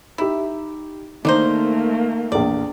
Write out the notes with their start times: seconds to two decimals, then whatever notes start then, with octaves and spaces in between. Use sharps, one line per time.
0.18 D#4 E4 G4
1.25 D#3 A3 A#3 D4 D#4 C5
2.32 A#1 E2 D5